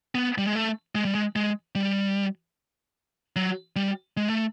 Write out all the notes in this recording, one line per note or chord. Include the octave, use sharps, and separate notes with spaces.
B3
G3
G#3
A3
G#3
G3
G#3
G#3
G3
F#3
G3
G#3
A3